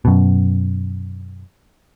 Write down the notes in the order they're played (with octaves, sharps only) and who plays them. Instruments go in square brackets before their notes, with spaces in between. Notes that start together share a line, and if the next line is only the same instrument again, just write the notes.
[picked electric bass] F#2 B2